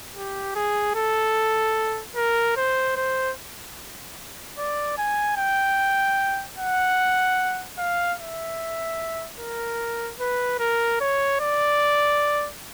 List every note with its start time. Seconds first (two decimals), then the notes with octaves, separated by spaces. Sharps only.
0.15 G4
0.56 G#4
0.95 A4
2.16 A#4
2.57 C5
2.97 C5
4.58 D5
4.98 G#5
5.37 G5
6.58 F#5
7.78 F5
8.20 E5
9.40 A#4
10.20 B4
10.60 A#4
11.01 C#5
11.41 D5